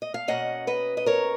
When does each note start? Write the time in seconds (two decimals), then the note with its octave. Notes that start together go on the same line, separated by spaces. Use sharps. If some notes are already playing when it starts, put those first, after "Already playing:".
0.02 D#5
0.14 F5
0.28 B2 A#3 C#4 D#5 F#5
0.67 B4 D#5
0.97 D#5
1.06 A#4 C#5